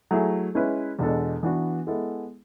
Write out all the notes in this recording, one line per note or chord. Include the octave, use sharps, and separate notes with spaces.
F#3 A3 E4 G#4
G#3 C#4 E4 B4
E2 B2 G#3 D4 A4
E3 B3 D4 F#4
G#3 B3 E4 A4